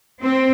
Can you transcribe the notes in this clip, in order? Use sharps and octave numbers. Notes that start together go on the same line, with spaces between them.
C4